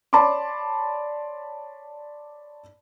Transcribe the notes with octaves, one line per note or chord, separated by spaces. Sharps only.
C#5 D5 A5 B5 C6 D6